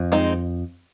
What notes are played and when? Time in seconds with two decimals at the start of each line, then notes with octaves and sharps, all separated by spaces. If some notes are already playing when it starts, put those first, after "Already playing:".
Already playing: F2
0.12 G#3 C4 D#4